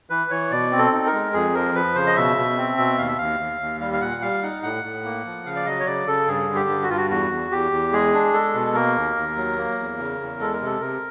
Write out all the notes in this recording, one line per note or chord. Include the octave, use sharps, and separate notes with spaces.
E3 B4
E3 C#5
B2 D5
C4
A4
D#4
A#4
G#3
F2 G#4
F3 A#4
F3 B4
C#3 C5
D#5
B2 E5
B2
C4
B2
D#2 F5
E5
D#2 F5
D#2
D#2
G3 F5
F5
A#2 F#5
G3 F5
D#4 F#5
A2 F#5
A2
A#3
F3
C#3 F5
D5
F#3 D#5
C#5
C#3 D5
C#3 A4
G2 G#4
D3
G4
G2
F#4
G2 F4
F#4
E2 F#4
E2
E2 G4
E2
G#3 G#4
D4
G#3 A4
B2
A#3 A#4
D#2
D#2
F#3
A#3
E2
C#3
E2
G#3 A4
A#4
C3 A4
C3 A#4